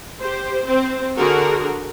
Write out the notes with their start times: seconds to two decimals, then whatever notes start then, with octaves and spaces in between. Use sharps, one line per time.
0.21 G4 C5
0.66 C4 C5
1.18 D3 F#4 G#4 A#4